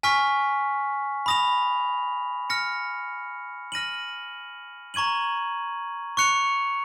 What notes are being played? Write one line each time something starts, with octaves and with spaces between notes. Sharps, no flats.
G#5 C#6 F6 B6
B5 D#6 A#6 F7
F6 A#6 C#7
F6 A#6 D#7 F#7
A#5 C#6 G#6 D#7 F#7
C#6 F#6 C#7 F7